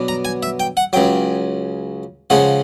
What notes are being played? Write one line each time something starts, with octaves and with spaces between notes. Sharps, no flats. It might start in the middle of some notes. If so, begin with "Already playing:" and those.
Already playing: B2 F#3 B3 D4
A#5
G#5
E5
G5
F#5
C#2 C#3 F#3 G5
C#3 F3 G#3 C#4 F#5